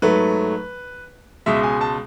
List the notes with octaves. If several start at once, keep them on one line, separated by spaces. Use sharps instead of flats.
G#2 F#3 A3 B4
C#2 B2 G#3 E5
G#5
A5